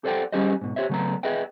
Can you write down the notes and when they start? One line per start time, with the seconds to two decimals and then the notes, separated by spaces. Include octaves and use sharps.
0.04 G4 A4 C5 D5 F#5 G5
0.32 G3 C#4 G4 G#4 C5 D#5
0.61 G#2 B2
0.76 G4 C5 C#5 E5
0.89 C#3 F#3 A3 B3 A#5
1.23 G#4 B4 D#5 E5 G5